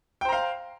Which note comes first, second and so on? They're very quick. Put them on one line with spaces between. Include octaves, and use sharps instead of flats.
G5 C5 A#5 F5